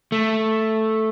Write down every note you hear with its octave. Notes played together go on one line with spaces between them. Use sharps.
A3